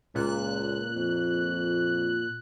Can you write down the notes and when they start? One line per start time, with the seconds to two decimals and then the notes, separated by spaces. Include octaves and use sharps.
0.15 C#2 A#2 F#6
0.95 F2